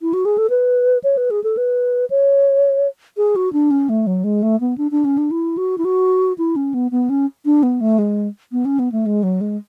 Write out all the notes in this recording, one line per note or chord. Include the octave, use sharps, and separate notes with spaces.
E4
F#4
G#4
A4
B4
C#5
B4
G#4
A4
B4
C#5
G#4
F#4
D4
C#4
A3
F#3
G#3
A3
B3
D4
D4
C#4
D4
E4
F#4
E4
F#4
E4
C#4
B3
B3
C#4
D4
B3
A3
G#3
B3
C#4
B3
A3
G#3
F#3
G#3